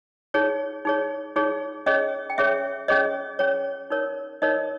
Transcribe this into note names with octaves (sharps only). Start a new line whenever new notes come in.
D#4 G#4 C#5
D#4 G#4 C#5
D#4 G#4 C#5
C#4 G#4 C#5 D#5
G5
C#4 G#4 C#5 E5
C#4 G#4 C#5 D#5
C#4 G#4 C#5
D#4 A#4 C#5
D#4 A#4 C#5 D#5